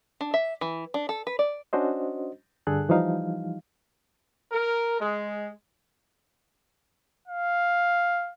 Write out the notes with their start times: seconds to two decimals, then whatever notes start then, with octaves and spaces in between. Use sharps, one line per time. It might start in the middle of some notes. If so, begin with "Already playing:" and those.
0.21 D4
0.34 E5
0.61 E3
0.94 D4
1.09 A4
1.27 B4
1.39 D5
1.73 C#4 D4 F#4 C5 D#5
2.67 G2 D3 G#4 A4 F#6
2.89 E3 F3 G3 D#4 F5
4.52 A#4
5.00 G#3
7.28 F5